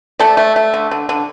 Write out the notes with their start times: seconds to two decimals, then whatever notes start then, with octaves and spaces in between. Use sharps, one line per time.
0.19 A3 A4 D5
0.37 A3
0.56 A3
0.74 D3
0.91 D3
1.09 D3